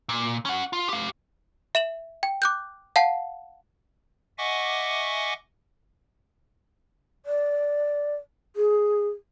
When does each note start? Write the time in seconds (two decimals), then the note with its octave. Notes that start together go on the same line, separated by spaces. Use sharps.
0.09 A#2
0.45 C#4 F#5
0.73 F4
0.89 G4 F5
1.75 E5 E7 F#7
2.23 G5
2.42 D6 F#6 G6
2.96 F5 F#5 A5 C7
4.38 D#5 E5 F#5 G#5 C#6 D6
7.26 D5
8.56 G#4